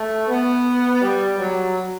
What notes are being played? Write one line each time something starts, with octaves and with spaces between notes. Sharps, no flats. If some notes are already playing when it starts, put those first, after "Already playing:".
Already playing: A3
B3
G3
F#3